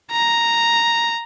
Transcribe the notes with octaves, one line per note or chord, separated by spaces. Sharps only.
A#5